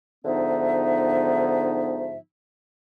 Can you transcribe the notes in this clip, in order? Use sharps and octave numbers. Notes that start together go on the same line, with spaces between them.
G#2 D3 F3 B3 D#4 E5